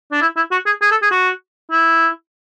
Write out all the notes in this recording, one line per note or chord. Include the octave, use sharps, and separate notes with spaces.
D4
E4
E4
F#4
G#4
G#4
A4
G#4
F#4
E4